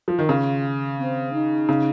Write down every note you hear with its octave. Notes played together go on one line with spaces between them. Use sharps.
F3
D#3
C#3 F4
C4
D#4
C#3